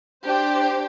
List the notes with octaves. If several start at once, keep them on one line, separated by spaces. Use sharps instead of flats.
D4 G4 C5